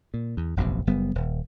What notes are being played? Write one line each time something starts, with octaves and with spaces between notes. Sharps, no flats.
A#2
E2
E1 A#1 F#2 C3
F#1 G3 B3
D#1